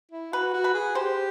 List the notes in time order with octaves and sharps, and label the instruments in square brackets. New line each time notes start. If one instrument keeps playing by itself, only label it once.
[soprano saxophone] E4
[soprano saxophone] F#4 [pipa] B4
[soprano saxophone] F#4
[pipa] B4
[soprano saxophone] G#4
[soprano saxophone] G4 [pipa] C5